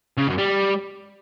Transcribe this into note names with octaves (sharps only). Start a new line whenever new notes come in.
C#3
F#2
G3